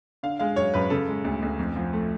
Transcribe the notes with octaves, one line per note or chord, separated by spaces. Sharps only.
D3 F5
G#3 F5
F#2 C#5
F#2 B4
C#3 A4
G#3
D2
D2
F2
F3
A3